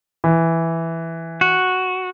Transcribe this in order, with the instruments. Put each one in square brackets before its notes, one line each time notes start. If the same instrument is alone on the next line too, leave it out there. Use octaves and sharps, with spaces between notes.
[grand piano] E3
[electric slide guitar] F#4